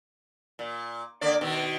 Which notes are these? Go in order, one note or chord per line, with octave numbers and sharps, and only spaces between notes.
A#2
D3 A#3 D5
B2 D#3